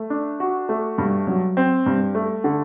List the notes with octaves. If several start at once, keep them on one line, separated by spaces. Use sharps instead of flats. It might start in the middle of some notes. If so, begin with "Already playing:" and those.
Already playing: A3
D4
F#4
A3
G2
F#3
C4
G2
A3
D3